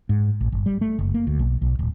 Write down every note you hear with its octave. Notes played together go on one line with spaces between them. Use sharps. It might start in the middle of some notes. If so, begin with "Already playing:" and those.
G#2
A1
G1
G3
A3
F#1
A#3
D2
B1
B1
D1